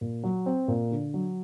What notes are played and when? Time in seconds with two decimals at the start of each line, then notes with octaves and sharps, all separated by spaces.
0.01 A#2
0.23 F#3
0.46 C4
0.68 A#2
0.91 D3
1.14 F#3